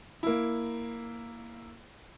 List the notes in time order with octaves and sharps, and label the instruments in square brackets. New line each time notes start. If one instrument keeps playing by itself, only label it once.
[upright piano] A#3 E4